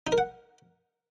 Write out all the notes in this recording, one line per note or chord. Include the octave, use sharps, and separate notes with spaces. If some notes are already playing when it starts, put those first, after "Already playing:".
D#4
A#4
F#5